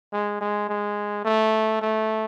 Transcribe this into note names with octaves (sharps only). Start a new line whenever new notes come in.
G#3
G#3
G#3
A3
A3